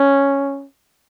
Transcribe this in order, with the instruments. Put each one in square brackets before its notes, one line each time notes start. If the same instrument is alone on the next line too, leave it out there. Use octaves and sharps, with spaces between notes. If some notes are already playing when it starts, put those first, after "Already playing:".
Already playing: [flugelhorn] C#4